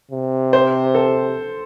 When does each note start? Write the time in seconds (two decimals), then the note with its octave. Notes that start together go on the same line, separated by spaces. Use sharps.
0.11 C3
0.53 C5
0.95 A4